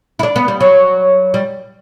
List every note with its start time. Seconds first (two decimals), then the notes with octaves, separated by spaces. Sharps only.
0.19 E4
0.23 D4
0.36 B3
0.48 G3
0.61 F#3
1.34 G3